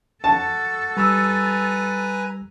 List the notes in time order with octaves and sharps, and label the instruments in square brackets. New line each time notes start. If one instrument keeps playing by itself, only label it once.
[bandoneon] F#4 [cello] A4 [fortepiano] A5
[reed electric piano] G3 E6 [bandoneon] B4 G#5 A#5